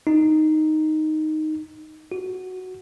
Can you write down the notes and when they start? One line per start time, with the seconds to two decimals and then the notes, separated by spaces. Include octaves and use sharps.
0.07 D#4
2.12 F#4